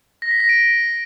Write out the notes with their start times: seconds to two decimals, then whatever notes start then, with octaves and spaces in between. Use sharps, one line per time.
0.22 A#6
0.31 B6
0.40 A#6
0.49 D7